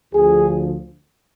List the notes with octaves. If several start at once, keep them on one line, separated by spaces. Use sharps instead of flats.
D2 D3 F3 G#4